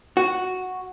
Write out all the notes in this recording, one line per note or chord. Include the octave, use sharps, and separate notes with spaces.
F#4